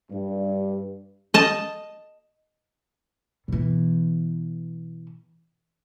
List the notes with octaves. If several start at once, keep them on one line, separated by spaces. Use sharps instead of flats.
G2
D#5 A5
B2 E3